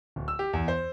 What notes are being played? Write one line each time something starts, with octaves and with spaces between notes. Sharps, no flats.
D1
E6
G4
E2
C5